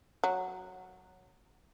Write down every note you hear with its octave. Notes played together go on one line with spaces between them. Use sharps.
F#3